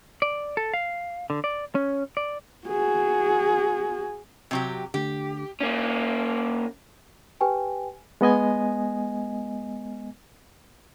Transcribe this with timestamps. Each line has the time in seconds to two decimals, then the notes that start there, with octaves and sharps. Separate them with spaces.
0.22 D5
0.57 A4
0.74 F5
1.30 D3
1.44 D5
1.75 C#4
2.17 D5
2.68 F#4 G#4
4.51 C3 F#3 G4
4.94 D3 A3 G4
5.60 A#3 C#4
7.41 G4 B4 G5 G#5
8.21 G#3 B3 D#5 G#5